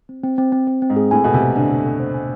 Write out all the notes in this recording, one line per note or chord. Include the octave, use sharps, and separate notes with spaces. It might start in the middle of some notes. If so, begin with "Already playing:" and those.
C4
C4
C4
C4
C4
C4
G#2
G#4
A2 G#5
B2 A4
C3
C5
D3 G#5
A4
A4
C5
G#5